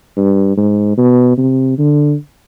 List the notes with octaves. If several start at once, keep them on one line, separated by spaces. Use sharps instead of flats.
G2
G#2
B2
C3
D3